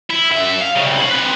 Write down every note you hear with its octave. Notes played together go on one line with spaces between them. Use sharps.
E4
F#2 E5
F5
C2 C#3
C#5 B5
C4 B4